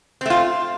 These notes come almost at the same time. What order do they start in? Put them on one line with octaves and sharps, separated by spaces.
C4 A3 F4